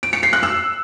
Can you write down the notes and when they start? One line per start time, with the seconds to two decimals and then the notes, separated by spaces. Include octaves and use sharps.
0.03 D7
0.13 C#7
0.23 C7
0.33 F#6
0.43 E6